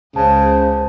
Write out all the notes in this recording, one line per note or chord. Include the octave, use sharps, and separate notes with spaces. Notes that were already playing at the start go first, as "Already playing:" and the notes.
C#2 C#3 C5 A5